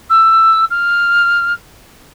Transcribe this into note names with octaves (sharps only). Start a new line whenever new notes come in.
E6
F6